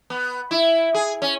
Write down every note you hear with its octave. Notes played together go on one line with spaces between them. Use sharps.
B3
E4
G#4
C#4